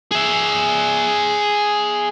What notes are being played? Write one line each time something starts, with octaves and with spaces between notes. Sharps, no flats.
G#4 E5